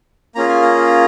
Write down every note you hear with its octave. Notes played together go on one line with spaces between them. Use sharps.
A#3 C#4 F4 G#4 A#5
G#5
A#5